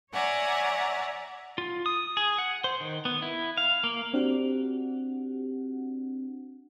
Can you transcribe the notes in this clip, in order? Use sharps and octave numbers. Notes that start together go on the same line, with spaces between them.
C#5 D5 E5 F#5 G#5 A#5
F4
D#6
G#4
F#5
C5
D#3
B3
E4
F5
A#3
C4 D4 F#4 G4 F#5